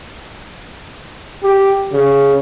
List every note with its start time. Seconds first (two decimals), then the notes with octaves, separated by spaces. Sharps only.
1.43 G4
1.93 C#3